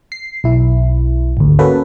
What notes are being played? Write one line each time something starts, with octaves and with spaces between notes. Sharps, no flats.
C7
B1 E4
G#1 D2
A#3 C#4 F#4 A4 B4